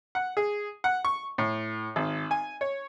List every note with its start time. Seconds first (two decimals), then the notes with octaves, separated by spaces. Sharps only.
0.15 F#5
0.37 G#4
0.84 F#5
1.05 C#6
1.38 A2
1.96 G#1
2.31 G#5
2.61 C#5